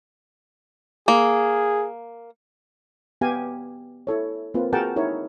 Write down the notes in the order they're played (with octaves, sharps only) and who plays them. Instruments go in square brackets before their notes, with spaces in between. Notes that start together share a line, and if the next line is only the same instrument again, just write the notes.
[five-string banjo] A#3 [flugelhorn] G#4
[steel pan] B3 G4 F5 G#5
E4 A4 C#5
A#3 C4 F4 B4
F#4 G#4 A#4 F#5 G5 A5
D#4 E4 A#4 C#5